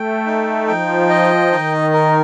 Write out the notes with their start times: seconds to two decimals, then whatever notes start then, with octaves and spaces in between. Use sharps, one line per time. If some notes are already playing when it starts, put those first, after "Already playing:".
Already playing: A3 G5
0.26 D#4
0.68 F3 G5
1.09 D#5
1.52 D#3 D#4
1.94 A#4